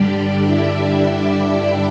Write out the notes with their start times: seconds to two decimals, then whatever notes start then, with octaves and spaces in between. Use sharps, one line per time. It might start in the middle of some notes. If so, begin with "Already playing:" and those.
Already playing: G2 D3 G3 D4 G4 D5
0.44 E4 E5